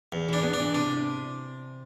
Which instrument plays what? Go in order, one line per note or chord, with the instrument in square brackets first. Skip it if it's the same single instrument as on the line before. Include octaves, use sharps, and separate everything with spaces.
[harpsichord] E2
[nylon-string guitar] E3 [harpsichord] D4
[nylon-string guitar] B3
[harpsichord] D4
[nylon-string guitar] E3
[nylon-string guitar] C3 [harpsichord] D4